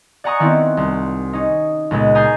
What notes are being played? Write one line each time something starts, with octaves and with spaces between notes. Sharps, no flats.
D5 F#5 G#5 A#5 C#6 D#6
D#3 B3 C4 E4
C2
C#4 D#4
C#2 A#2 G#3 B3
G#5 A#5 D#6 G6 A6 C7